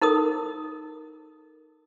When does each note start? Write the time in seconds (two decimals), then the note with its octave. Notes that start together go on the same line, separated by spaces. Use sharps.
0.01 D#4 A4 A#4 D#6